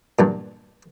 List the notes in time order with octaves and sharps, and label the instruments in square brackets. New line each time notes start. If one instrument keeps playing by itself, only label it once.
[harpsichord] E2 G2 A#2